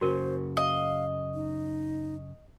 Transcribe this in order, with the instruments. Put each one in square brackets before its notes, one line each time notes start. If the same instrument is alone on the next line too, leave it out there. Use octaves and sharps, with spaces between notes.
[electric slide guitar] F#2 C#3 [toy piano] F#4 A#4 [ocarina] C5
[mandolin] D#5 [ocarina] F5
[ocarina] D#4